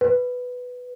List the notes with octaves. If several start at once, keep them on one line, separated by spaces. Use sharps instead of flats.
B4